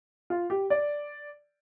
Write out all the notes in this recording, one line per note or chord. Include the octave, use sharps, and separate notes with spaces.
F4
G4
D5